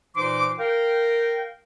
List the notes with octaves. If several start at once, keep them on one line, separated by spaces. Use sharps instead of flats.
A#2 E3 D#4 C5 C6 D6
A#4 F5 G5